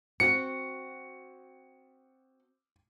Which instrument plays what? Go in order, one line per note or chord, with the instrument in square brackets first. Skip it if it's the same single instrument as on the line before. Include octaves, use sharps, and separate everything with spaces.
[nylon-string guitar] C4 F#4 [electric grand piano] C#7